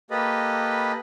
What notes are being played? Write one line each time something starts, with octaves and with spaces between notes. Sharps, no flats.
A#3 G4 A4 B4 D#5 B5